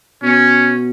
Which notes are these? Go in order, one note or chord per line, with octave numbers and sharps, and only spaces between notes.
B2 C#4